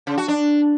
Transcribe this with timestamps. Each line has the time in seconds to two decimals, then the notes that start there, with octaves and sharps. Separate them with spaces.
0.07 C#3
0.18 F#4
0.28 D4